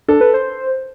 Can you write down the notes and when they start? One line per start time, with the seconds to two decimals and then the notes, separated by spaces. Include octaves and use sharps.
0.08 D4 A4
0.21 B4
0.34 C5